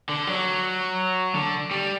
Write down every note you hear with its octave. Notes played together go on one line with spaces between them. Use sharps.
D3
F#3
D3
G3